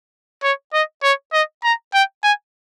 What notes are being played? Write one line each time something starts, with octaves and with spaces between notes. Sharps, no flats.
C#5
D#5
C#5
D#5
A#5
G5
G#5